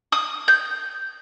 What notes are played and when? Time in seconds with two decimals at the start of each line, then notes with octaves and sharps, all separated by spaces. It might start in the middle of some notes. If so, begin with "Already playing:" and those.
0.12 D#6
0.48 G6